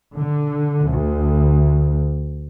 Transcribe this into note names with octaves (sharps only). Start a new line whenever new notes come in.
D3
D2